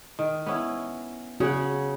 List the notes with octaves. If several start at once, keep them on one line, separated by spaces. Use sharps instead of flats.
D#3
B3 C#4 E4
C#3 F#4 G#4 F#5